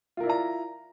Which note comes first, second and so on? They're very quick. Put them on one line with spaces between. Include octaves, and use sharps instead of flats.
F4 A#4 E4 D5 A#5